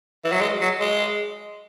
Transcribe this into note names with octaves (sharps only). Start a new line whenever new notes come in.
E3
F#3
G#3
F#3
G#3